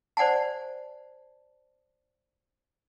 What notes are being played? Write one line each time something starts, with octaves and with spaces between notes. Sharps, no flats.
C5 D5 F#5 G#5 A5